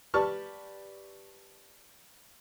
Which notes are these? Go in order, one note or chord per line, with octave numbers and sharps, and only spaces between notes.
G4 B4 D5 A5 C#6 F6